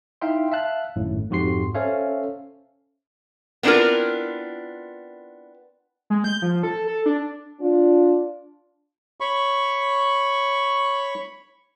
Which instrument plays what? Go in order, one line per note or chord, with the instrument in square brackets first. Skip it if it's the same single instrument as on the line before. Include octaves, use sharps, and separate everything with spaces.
[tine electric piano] D#4 E4 E5 F5 G5 C6
E5 F5 A5 F#6
G#1 F#2 A2
F2 G#2 F#4 G4 C6 C7
C#4 A4 C5 C#5 E5 F5
[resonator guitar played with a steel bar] B3 C4 D4 E4 F4 A#4
[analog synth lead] G#3
G6
F3
A4
A4
D4
[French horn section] D4 F4
[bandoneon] C#5 B5 C#6